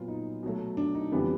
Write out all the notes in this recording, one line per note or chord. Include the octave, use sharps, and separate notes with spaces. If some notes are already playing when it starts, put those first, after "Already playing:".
Already playing: A#2 F#3 B3 F4
D#4
B2 F#3 A3
D4
D#4
F2 C#3 E3 G3 B3 D4